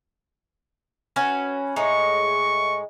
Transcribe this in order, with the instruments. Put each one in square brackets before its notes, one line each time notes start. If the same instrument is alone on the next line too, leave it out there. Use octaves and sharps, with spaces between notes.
[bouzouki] C#4 F#4 B4
[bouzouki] A2 G#3 D#4 [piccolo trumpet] C#6